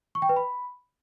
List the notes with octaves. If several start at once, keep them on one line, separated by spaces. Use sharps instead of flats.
C#6
G5
B4
B5